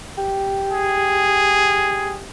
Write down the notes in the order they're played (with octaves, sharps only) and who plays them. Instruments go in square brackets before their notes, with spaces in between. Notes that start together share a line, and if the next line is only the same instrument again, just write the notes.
[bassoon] G4
[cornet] G#4